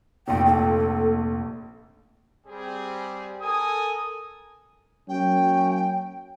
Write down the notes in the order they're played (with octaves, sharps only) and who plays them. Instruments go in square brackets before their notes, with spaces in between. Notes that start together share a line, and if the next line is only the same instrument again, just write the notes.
[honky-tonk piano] F1 A#1 [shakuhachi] G5
[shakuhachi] A4
[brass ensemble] G3 C4 G#4
[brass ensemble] A4 A#4 G#5 [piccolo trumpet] D#6
[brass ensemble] F#3 A#3 C#4 [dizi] G5